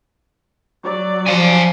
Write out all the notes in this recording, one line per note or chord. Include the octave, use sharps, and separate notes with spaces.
F#3 D5
F3 F5 G#5